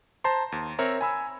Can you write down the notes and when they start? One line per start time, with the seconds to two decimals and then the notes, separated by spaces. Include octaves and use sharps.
0.24 C5 A5 A#5 C6
0.52 D#2
0.79 C4 A#4 C#5 E5 A#5
1.01 G#5 B5 E6